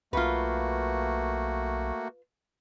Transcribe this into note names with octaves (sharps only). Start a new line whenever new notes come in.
B1 A3 A#3 F4 F#4 B4